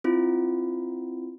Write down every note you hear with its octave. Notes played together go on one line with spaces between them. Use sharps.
C4 E4 F4